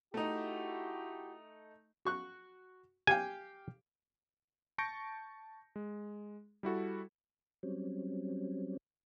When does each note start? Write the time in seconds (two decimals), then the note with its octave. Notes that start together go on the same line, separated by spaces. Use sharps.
0.14 A3 D#4 E4 F#4 G4
2.05 F#4 C#6 F#6
3.07 G4 F5 G5 G#5
4.78 A5 C#6 G6 A#6 C#7 D7
5.76 G#3
6.63 G3 E4 F#4 A4
7.63 F#3 G3 C4 C#4